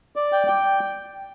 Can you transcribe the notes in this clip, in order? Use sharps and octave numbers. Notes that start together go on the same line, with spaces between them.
D5
G5
G5